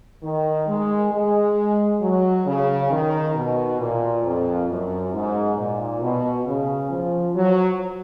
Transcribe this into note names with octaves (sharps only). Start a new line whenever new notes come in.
D#3
G#3
G#3
F#3
C#3
D#3
B2
A#2
F2
F#2
G#2
A#2
B2
C#3
F3
F#3